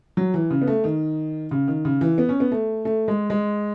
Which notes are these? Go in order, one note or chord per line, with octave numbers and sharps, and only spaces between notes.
F#3
E3
C#3
B3
A3
D#3
C#3
D#3
C#3
E3
B3
C#4
B3
A3
A3
G#3
G#3